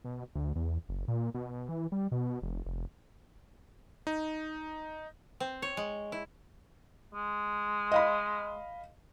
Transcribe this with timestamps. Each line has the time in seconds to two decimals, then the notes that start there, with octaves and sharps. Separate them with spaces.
0.05 B2
0.35 D2
0.56 E2
0.89 F#1
1.08 A#2
1.34 B2
1.69 E3
1.92 G3
2.12 B2
2.42 F1
2.66 F1
4.07 D#4
5.40 C4
5.62 C#5
5.77 G#3
6.12 E4
7.14 G#3
7.92 D#5 F5 B5